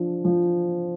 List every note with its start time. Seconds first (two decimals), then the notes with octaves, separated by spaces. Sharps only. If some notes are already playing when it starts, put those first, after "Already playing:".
Already playing: F3 D4
0.24 F3